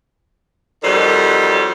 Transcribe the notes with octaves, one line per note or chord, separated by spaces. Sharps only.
F2 D#3 F#3 G3